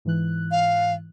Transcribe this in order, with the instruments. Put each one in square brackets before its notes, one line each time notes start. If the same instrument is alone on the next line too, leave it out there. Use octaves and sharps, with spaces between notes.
[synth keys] G#2 E3 F#6
[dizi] F5